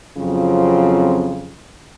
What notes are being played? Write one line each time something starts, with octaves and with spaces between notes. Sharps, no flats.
F2 C#3 F#3 C4 F4